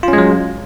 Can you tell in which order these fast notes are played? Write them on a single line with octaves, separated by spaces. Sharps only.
F4 C#4 G#3 F#3